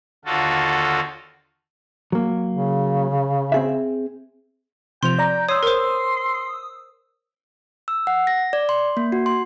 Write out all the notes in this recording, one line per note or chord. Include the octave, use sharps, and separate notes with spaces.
D#2 D3 F4 F#4 A4
F#3 A#3
C#3
C4 G#4 E5
C3 F3 G5 C6 F7
D5 A#5
C#5 C6 D#6 E6
A#4 C5
E6
F#5
A#6
D5
C6
A#3
F#4
C6